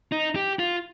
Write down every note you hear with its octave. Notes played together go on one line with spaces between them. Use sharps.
D#4
G4
F4